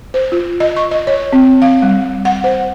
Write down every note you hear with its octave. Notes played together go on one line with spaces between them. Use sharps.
C5
F4
D#5
C#6
D#5
C#5
C4
F5
G3
F#5
C5